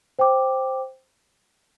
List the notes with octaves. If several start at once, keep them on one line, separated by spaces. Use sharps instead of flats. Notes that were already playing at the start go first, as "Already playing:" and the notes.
C5 G5 D6